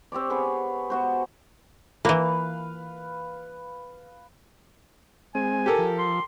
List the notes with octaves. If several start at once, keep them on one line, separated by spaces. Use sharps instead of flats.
C4 G4 C#5 D5
B3 G#4 B4 C#5
B3 F#4 C5
E3 A#3 B4 F5
G#3 C4 G#5
G4 A4 A#4
F3
C6